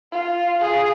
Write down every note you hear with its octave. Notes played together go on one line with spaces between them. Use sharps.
F4
F4 G#4